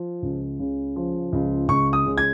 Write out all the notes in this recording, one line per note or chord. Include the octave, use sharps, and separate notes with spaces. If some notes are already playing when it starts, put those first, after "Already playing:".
Already playing: F3
C#2
C#3
F3
C#2
C#2 C#6
D#6
C#3
G#6